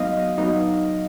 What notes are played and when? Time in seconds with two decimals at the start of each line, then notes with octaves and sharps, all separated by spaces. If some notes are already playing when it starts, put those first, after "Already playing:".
Already playing: F#3 B3 D#4 D#5 F5
0.38 F#3 B3 D#4